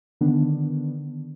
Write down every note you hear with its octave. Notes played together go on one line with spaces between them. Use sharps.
D3 D#3 B3 D4